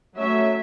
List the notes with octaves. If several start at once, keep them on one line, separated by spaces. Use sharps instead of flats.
F#3 A3 C#4 E5